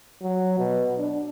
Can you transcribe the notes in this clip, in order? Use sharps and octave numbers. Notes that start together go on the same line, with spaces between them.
F#3
B2
D4